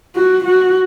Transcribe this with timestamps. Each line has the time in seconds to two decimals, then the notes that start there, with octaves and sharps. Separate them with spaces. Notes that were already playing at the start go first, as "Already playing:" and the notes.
0.15 F#4
0.44 F#4